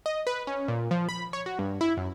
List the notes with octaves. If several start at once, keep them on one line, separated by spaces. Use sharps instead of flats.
D#5
B4
C#4
A#2
F3
B5
C#5
F#4
G2
E4
F#2